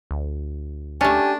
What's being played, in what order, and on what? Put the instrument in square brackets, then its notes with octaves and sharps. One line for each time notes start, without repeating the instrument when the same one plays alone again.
[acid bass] D2
[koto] A3 C#4 [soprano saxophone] D4 [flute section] G4 G#5